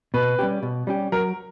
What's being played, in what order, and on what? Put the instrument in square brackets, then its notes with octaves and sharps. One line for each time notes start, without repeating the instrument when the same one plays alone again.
[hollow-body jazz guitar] B2 [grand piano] B4
[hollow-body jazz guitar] G3 C#4 G4
B2
G3 C#4 G4
[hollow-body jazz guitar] F#3 [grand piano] A#4